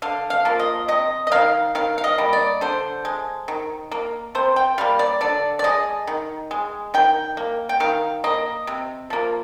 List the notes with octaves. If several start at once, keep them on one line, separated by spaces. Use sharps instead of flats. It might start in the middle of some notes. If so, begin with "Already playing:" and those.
D3 F5
F5
F3 A#3
D#5
C3 D#5
D#5
D#3 A#3 F5
D#3 F5
F5
D#5
G3 A#3
D5
D3 C5
G#3
D#3
A#3
C3 C5
G5
G3 A#3 F5
D5
D3 D5
D5
G#3 D#5
D#3
G#3
D#3 G5
A#3
G5
D#3 F5
A#3 D#5
C3
F3 A#3